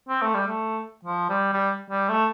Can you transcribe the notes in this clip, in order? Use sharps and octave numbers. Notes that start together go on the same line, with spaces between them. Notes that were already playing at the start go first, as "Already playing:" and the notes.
C4
A3
G3
A3
F3
G3
G3
G3
A3